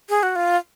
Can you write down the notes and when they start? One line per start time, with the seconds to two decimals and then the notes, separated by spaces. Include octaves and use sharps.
0.09 G#4
0.23 F#4
0.36 F4